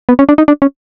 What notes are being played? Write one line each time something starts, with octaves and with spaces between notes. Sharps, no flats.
B3
C#4
D4
D#4
D4
C#4